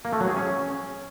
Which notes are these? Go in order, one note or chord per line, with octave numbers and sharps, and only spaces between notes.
A#3
A3
F#3
G#4
C#4